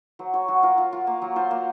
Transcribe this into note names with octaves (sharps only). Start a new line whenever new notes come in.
F#3 C5
F#3 C#5
F#3 F#4
F4 A#4
F4
F4
A#3
F#3
F4 C5
A#3